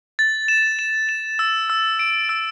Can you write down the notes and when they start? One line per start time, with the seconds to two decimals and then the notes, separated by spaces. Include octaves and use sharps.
0.19 A6
0.48 E7
0.79 E7
1.09 E7
1.39 E6
1.70 E6
1.99 D7
2.29 E6